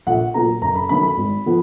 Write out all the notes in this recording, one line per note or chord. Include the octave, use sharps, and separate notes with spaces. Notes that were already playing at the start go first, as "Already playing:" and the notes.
A#1 F#5
A#2 F#3 B3 A#5
F#1 A#5
B5
F#2 D#3 F#3 B3 B5
B5
G#1
F3 B3